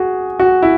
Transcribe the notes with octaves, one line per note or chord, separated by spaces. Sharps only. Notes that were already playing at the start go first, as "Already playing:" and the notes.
Already playing: F#4 G#4
F#4
E4